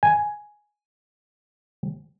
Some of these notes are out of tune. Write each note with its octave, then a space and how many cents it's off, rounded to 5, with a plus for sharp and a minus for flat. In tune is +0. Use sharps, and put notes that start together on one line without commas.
G#5 +5